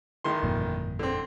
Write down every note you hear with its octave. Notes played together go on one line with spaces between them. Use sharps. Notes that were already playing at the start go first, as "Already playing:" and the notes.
A1 D#3 C6
G1 F2 A#2
D3 C4